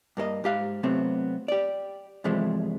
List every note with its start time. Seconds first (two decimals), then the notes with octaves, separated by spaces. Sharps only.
0.17 G2 A#3 A#4 D#5
0.44 G#2 G4 F5
0.83 C3 F#3 A3 B3 C4
1.48 G4 D5
2.24 G2 C3 E3 F3 G#3 A3